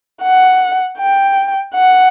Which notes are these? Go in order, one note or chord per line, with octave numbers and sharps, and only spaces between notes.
F#5
G5
F#5